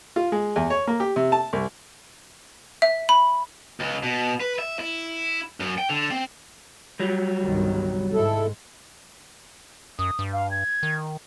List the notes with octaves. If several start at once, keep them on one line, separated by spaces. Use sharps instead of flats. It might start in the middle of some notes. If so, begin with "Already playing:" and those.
F4
G#3
E2
C#5
A#3
G4
C3
A5
C2
E5
B5
C#2
B2
B4
E5
E4
F#2
G5
D3
C4
F#3 G3
G1 C2 D#3
G#2 G#3 E4 A4
F#2 D#6
G2
F5
G#6
D#3